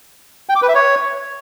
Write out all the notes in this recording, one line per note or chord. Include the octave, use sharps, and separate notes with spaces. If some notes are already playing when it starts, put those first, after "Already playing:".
G5
D6
B4
E5
C#5